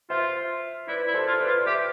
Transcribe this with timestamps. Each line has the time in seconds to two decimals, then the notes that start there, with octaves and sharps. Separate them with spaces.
0.10 F4 C5 E5
0.88 E4 B4 D5
1.08 E4
1.14 A4 C5
1.27 F4
1.40 B4 D5
1.47 F4
1.67 G4 C5 E5